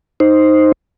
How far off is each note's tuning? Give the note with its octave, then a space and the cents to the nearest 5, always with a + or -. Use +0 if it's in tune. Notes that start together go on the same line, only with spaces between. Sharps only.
D#4 +0 C5 +0